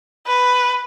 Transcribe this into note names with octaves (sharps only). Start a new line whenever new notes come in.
B4